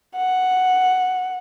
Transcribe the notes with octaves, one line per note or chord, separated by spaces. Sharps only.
F#5